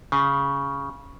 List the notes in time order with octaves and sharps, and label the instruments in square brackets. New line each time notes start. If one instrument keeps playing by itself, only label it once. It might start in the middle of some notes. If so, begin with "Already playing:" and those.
[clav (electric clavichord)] C#3